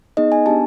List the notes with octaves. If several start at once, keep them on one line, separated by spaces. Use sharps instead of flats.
B3 D#4 G#4 D#5
G#5
B3 D4 G4 A5